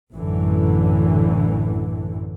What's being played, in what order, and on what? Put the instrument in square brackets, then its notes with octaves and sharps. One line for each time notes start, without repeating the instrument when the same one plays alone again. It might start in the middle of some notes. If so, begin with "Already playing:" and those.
[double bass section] A1 F#2 D3 E3